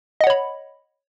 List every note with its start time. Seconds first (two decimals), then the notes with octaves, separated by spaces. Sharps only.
0.21 D#5
0.24 F#5
0.27 C#5
0.30 B5